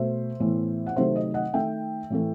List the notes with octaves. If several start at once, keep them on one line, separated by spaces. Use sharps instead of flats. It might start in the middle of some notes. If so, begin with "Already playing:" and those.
Already playing: B2 A3 C5 E5
A2 E3 B3
F#5
C3 D#3 F#3 A3 C5 E5
D#5
D#5 F#5
D#3 A3 E5 G5
A2 E3 A3